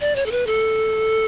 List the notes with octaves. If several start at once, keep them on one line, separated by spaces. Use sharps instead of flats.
D5
C#5
A4
B4
A4